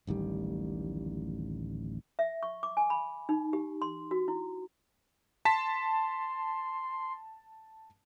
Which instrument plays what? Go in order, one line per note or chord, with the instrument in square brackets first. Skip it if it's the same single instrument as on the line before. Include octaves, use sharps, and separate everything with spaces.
[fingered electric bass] D1 A1 D#3 G3
[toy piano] E5
C#6
D6
G#5
B5
D#4
G4
C6
F#4
E4
[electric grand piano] A5 B6 [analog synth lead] C6